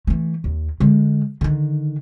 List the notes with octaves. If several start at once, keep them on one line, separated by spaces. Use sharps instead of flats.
E3 A3
D#2
D3 G#3
D3 D#3